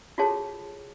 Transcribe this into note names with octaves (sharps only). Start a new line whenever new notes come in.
F4 F#4 G#4 A4 C#5 A5